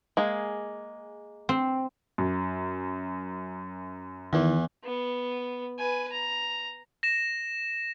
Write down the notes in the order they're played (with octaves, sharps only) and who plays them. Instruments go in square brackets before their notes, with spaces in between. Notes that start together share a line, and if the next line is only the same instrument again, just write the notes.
[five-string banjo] G#3 A#3 G#4
[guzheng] C4
[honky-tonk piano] F#2
[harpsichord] E2 E3 [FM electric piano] D#3 E4
[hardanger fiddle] B3
B4 G#5
A#5
[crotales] A#6 E7